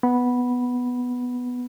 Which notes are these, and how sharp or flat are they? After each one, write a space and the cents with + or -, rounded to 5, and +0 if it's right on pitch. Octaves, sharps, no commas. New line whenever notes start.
B3 +0 B5 -10